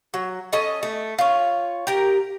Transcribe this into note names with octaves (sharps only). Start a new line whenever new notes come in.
F#3
C#4 A4 D#5 A5
A3
F4 C#5
G4 A#4